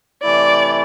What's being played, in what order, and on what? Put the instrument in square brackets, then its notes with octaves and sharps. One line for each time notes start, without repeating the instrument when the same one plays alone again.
[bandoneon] C3 E3 A3 E4 [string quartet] D5